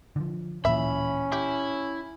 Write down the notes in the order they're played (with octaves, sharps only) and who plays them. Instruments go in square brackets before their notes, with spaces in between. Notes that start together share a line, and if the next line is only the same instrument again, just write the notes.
[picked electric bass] D3 E3 F3
[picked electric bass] D1 A#2 E3 [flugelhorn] C#4 [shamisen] E5 [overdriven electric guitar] B5
[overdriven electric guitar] E4 [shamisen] G4